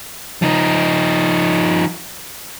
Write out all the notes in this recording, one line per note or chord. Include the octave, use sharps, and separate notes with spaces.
F3 D#4